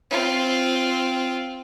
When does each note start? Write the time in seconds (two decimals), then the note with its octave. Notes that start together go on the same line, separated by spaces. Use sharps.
0.11 C4 F4